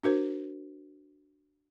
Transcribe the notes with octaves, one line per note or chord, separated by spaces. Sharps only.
D4 F#4 A#4 C5